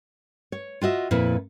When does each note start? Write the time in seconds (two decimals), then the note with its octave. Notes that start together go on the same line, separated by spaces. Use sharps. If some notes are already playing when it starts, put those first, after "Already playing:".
0.52 C#5
0.81 F4 F#4 D#5 E5
1.11 F2 A#2 E4 B4